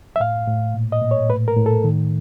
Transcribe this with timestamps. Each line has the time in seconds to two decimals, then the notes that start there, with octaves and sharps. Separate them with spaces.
0.16 E5
0.20 A2 F5
0.48 A2
0.74 A#2
0.92 D#5
1.01 A#2
1.11 C#5
1.30 A2 B4
1.48 A#4
1.57 A2
1.66 A4
1.84 D#3